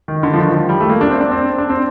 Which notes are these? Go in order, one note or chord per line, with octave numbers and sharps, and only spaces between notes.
D#3
D3
F3
D#3
F3
F3
G3
A3
A#3
D4
C4
D4
C4
D4
C4